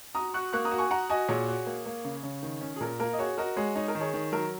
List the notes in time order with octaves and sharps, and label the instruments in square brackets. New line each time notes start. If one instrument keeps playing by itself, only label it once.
[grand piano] F#4 [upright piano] A#5 D#6
[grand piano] F#4 [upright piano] C#6 F#6
[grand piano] A#3 [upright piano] C#6 F#6
[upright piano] A#5 D#6
[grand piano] F#4
[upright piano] G#5 C#6
[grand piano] F#4 [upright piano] F#5 A#5
[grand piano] F#4 [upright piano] D#5 G#5
[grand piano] A#2 [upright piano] G#4 C#5
[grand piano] F#4
A#3
A#3
C#3
C#3
D#3
C#4
[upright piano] G#4
[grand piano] A#2 [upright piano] A#4
[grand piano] A#3 [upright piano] A#4
[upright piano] D#5
[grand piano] F#4 [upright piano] G#4 C#5
[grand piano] F#4 [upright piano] A#4 D#5
[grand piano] G#3 [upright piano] G#4 C#5
[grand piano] D#4 [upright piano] C#5
[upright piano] A#4
[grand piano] D#3
[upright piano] G#4 C#5
[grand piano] D#3
[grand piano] F#3 [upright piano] A#4